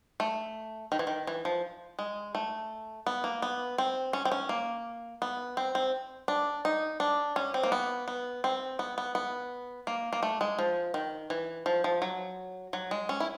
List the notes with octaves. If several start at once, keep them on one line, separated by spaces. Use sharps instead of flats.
A3
D#3
E3
D#3
E3
F3
G#3
A3
B3
A#3
B3
C4
C#4
C4
C#4
A#3
B3
C4
C4
D4
D#4
D4
C#4
C4
A#3
B3
B3
C4
B3
B3
B3
A#3
A#3
A3
G#3
F3
D#3
E3
F3
F3
F#3
F#3
G#3
C#4
E4